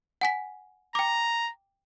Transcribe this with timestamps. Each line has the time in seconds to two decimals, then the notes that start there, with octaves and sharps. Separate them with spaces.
0.21 F#5 G#5 B6
0.95 G5 A#5 D6